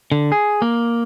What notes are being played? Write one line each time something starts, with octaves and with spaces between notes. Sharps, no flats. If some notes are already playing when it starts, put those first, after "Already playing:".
D3
G#4
A#3